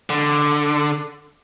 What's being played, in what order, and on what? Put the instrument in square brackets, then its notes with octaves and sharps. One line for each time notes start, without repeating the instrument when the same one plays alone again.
[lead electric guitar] D3